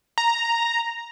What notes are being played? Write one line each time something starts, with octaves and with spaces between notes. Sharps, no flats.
A#5